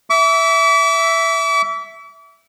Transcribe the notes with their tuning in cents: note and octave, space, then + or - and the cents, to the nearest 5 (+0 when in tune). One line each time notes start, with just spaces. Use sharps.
E5 +0 D6 -40